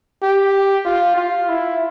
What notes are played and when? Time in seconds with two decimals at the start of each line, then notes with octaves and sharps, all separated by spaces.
0.23 G4
0.85 F4
1.17 F4
1.49 E4